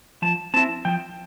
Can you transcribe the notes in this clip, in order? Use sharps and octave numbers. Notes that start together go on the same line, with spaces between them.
F3 A5
C4 E4 A5
F3 G5